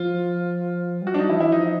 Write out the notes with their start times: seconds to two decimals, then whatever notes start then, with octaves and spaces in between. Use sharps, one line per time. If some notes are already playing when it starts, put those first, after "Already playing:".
Already playing: F3 F4
1.02 G3
1.07 F#3 F#4
1.14 D4
1.18 G3 D#4
1.29 E3 E4
1.35 F3
1.40 E3 E4
1.52 F3 D#4